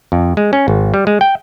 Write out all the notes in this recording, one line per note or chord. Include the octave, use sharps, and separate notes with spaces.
F2
G#3
C#4
G#1
G3
G#3
G5